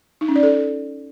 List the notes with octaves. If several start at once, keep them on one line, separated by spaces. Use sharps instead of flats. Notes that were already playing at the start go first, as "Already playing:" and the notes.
D#4
C#4
D5
A4